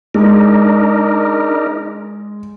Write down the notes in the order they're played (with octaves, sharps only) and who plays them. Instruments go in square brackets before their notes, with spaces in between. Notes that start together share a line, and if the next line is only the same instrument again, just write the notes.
[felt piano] G#3 [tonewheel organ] D4 D#4 A#4